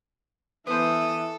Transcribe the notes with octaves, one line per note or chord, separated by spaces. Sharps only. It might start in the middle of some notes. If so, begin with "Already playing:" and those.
E3 B3 A4 C5 D#6